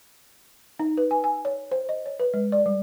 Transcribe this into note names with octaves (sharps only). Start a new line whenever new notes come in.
D#4
B4
G#5
G#5
C#5
C5
D#5
C#5
B4
G#3
D5
G3